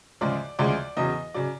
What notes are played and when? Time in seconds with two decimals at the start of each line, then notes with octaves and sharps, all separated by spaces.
0.21 D2 C#3 F3 G#3 D5
0.59 D2 C#3 F3 G#3 D5
0.97 E2 C#3 F#3 D#5
1.34 C#3 F#3 D5